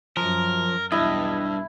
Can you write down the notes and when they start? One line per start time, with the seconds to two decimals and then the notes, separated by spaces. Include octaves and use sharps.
0.17 F#2 F3 A#4
0.92 B1 E2 G2 E4 D#5